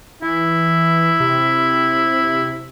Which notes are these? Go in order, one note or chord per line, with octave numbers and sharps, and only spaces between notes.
E3 E4
C3